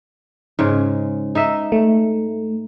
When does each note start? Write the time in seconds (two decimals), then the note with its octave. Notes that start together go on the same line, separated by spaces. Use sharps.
0.59 G#2 C#3 G#3
1.35 D#4 D#5 E5
1.72 A3